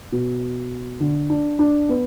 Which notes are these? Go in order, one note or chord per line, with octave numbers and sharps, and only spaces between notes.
B2
D3
D4
D4
B3